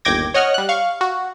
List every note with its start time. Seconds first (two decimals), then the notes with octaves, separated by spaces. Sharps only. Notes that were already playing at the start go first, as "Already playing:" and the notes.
0.05 G1 D#2 G5 D6 G#6 A#6
0.34 C#5 D#5 F#5 F6
0.54 G3 F#6
0.69 F5 C#6
1.01 F#4